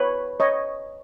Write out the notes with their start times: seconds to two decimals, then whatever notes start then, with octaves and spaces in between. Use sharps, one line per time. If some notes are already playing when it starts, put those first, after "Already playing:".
Already playing: B4 C#5
0.40 C#5 D#5